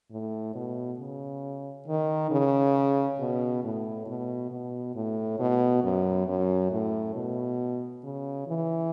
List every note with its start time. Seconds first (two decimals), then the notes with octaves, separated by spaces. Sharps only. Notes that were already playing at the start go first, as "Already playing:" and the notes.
0.11 A2
0.55 B2
0.99 C#3
1.87 D#3
2.31 C#3
3.19 B2
3.63 A2
4.07 B2
4.51 B2
4.95 A2
5.39 B2
5.83 F#2
6.27 F#2
6.71 A2
7.15 B2
8.04 C#3
8.47 E3